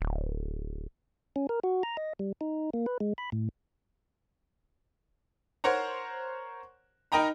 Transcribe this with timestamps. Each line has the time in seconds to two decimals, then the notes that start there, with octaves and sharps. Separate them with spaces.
0.01 D1
1.36 C#4
1.49 A#4
1.64 F#4
1.83 A#5
1.97 D#5
2.19 G3
2.41 D#4
2.74 A#3
2.86 B4
3.00 G#3
3.18 B5
3.32 A2
5.64 A#4 C5 C#5 F#5 A#5
7.12 D#4 A#4 D#5 G5 A#5 B5